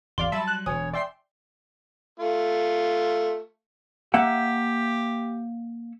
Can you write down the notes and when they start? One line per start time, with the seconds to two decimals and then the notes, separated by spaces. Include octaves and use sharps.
0.18 G#1 E2 D5 F5 C6
0.32 F#3 G3 E5 A5 B5
0.48 F#6
0.66 E1 D2 C#5 G#5 D#6
0.93 D5 E5 G5 C6
2.20 A3 F4
4.14 A#3 G4 E5 F#5